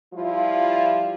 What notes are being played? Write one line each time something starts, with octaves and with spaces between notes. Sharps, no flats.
F3 G3 E4 F4